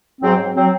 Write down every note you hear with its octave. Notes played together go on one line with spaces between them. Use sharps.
G#2 F#3 C4
F#3 C4